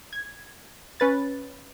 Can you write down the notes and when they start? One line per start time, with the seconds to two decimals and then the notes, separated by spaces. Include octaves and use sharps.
0.13 G#6
1.00 C#4 B4 A6